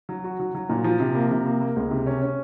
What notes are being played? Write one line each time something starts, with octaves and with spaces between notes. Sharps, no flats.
F#3
F#4
F#3
F#3
A#2
F3
C3
A#3
C3
A#3
A#3
C#2
C3
C#4
C#4